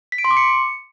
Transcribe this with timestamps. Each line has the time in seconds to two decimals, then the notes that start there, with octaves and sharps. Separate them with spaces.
0.12 B6
0.18 D7
0.24 C6
0.31 D6
0.37 C#7